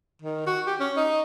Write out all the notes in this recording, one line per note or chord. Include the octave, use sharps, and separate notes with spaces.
D#3
F#4
G4
C#4
D#4